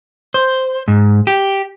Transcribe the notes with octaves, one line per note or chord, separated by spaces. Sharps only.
C5
G#2
G4